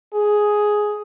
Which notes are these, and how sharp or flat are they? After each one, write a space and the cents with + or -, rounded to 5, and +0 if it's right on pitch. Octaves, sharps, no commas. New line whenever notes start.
G#4 +5